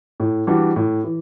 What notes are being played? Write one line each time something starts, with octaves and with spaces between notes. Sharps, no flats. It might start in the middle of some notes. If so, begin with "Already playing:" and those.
A2
E3 G3 D4 F#4
A2
E3